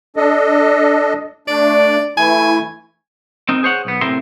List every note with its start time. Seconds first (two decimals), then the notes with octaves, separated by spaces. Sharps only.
0.17 D4 A4 D#5
1.48 A3 D4 D5
2.17 E3 A3 E4 G#5
3.49 C4 D#4 A#4
3.63 G#4 C5 C#5 F#5
3.85 B1 B3
4.01 A2 C3 C4 A#4 C6